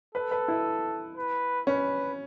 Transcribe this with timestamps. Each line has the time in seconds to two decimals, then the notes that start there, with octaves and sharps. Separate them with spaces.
0.15 A4 B4
0.31 B4
0.48 E4
1.16 B4
1.67 C#4 B4